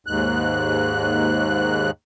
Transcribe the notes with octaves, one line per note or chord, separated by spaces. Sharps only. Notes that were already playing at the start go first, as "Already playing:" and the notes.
D#2 G#2 F#6